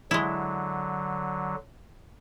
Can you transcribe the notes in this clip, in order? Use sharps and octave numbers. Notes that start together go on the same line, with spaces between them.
D3 F#3 G#3 E4